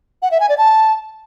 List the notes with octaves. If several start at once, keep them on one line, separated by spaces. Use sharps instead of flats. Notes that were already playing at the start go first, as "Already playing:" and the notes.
F#5
E5
G#5
D5
A5